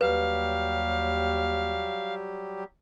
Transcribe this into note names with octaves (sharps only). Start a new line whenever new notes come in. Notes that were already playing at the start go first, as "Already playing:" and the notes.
D#2 F#3 G3 G4 B4 F5